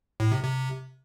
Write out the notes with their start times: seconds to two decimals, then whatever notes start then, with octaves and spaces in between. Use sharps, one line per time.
0.20 A2
0.32 C3
0.44 C3